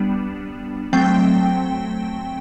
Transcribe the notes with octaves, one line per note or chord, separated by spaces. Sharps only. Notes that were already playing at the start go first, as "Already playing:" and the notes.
Already playing: G3 B3 D4
F#3 A3 C4 G5